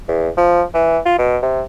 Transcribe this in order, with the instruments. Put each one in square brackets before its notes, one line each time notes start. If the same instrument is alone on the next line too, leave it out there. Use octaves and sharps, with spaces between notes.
[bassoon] E2
F3
E3
F4
B2
C3